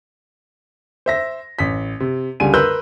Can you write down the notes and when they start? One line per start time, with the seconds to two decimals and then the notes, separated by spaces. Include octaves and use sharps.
1.06 C5 E5 A#6
1.59 A1 B6
2.00 C3
2.40 C#2 D3 G3 G#5 D#7
2.54 A#4 B4 C6 E6 F#6 G6